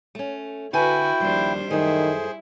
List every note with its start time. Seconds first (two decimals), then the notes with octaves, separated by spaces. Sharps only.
0.15 A3 C#4
0.73 D3 E4 F#4 B4 G5 G#5
1.20 D#2 F3 G3 D4 C5
1.70 F#2 D#3 A3 E4 G#4 C5